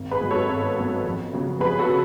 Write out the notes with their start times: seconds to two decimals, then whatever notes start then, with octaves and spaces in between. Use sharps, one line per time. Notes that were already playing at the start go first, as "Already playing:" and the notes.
Already playing: G#1
0.11 G#4 B4
0.21 G#2 F#3 B3
0.31 A4 C#5
0.49 G#1
0.76 G#2 F#3 B3
1.05 F2
1.33 C#3 F#3 B3
1.60 F2 G#4 B4
1.79 F#4 A4
1.89 C#3